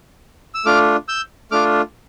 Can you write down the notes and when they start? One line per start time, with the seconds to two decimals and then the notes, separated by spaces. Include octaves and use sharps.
0.55 E6
0.66 A3 D4 F4 D6 F6
1.08 E6 G6
1.51 A3 D4 F4 D6 F6